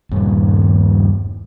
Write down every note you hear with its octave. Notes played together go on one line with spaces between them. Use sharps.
D#1 G2 A#2